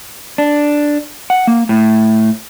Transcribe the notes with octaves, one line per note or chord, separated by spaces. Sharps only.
D4
F#5
A#3
A2